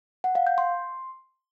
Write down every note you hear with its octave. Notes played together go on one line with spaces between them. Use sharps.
F#5
F5
G6
C6